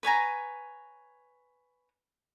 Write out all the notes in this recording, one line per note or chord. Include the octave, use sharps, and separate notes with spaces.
B4 C#5 G#5 A#5